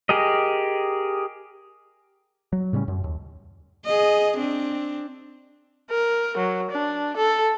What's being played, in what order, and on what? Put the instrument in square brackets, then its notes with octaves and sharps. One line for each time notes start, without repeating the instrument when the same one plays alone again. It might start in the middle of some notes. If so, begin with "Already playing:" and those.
[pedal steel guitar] G4 G#4 A#4 D#5
[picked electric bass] F#3
A2 C#3 G3 C#4
F#2
D#2
[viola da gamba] G#4 D#5
C4 D4
[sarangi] A#4
F#3
D4
A4